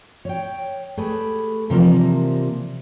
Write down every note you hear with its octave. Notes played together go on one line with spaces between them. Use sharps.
C#5 G5
A3 G4 G#4 B4
C3 E3 F3 G3 A#3 A#4